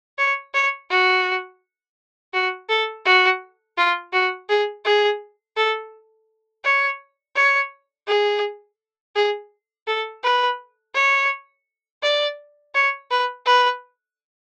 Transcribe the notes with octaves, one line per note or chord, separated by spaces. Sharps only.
C#5
C#5
F#4
F#4
A4
F#4
F4
F#4
G#4
G#4
A4
C#5
C#5
G#4
G#4
A4
B4
C#5
D5
C#5
B4
B4